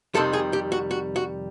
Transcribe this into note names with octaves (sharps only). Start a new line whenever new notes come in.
F2 C3 D#3 G3 A4
G#4
G4
F#4
F#4
F#4